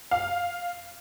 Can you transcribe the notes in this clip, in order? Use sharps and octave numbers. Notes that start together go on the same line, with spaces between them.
F5